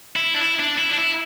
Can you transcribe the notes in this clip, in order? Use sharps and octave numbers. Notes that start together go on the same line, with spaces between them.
E4
D4
E4
D4
E4
D4
E4